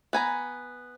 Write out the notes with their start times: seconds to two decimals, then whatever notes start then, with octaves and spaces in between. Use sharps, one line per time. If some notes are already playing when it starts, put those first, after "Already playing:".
0.13 B3 G#5 A#5